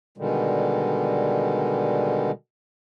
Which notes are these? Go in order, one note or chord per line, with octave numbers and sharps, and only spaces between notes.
B2 D3 D#3 G3 G#3